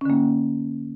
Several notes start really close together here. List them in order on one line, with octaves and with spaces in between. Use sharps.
C#4 D3 A#3